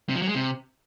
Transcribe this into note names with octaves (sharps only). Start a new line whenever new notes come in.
C3
F3
F#3
G#3
C3